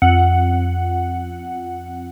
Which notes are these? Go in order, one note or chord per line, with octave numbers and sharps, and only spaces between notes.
F2 F#5